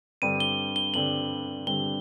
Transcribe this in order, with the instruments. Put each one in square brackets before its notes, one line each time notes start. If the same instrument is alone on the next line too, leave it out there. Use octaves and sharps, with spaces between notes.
[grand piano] G2 D3 G3 C4 [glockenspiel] D#7
[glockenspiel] G7
G7
[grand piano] G2 D3 G3 C4 [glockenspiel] F#7
[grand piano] G2 D3 G3 C4 [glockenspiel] G7